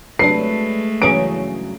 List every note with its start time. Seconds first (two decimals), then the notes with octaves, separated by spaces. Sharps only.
0.19 C3 F#3 G#3 A3 D4 B4 C7
1.02 G2 C#3 E3 F#3 C#4 G#4 D7